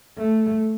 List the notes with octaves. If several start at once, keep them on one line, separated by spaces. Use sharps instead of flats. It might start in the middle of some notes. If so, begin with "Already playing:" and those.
A3